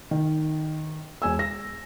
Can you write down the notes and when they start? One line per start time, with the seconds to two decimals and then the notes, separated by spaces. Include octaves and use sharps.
0.11 D#3
1.22 E1 G#5 E6
1.39 A#6